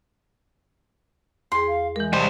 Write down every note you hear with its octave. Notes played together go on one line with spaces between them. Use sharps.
E2 G#4 C6
F5
E3 G#3 A#4
G3 A4 C5 D#5